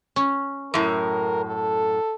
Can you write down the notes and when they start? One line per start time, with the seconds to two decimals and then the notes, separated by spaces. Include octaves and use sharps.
0.16 C#4
0.74 F#2 A2 A#4
1.45 A4